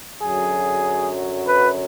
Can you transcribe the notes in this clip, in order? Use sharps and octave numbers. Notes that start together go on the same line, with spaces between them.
F#2 D3 F#3 G#4
B4